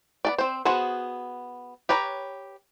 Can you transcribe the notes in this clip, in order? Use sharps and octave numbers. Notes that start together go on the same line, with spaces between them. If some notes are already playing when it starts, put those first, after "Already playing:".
B3 A4 D5
C4 C5
B3 F#4 G#4 C5 F#5
G4 B4 C#5 A#5